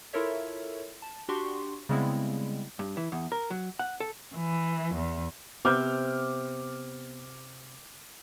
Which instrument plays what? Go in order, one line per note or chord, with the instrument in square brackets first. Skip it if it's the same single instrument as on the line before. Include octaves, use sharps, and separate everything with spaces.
[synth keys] E4 F4 A4 A#4 C#5 E5
A5
D4 F#4 G4 C6 C#6
C#3 G3 G#3 B3 C4 E4
[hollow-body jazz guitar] G2
E3
E2
A#4
F#3
F#5
A4
[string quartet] E3
E2
[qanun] C3 [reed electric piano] B3 E6 [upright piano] D6 F6 G6